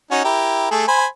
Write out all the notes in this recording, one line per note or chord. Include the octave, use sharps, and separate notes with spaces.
C#4 D#4 F#4
E4 G4 A#4
A3 G#4 A4
C5 G#5 B5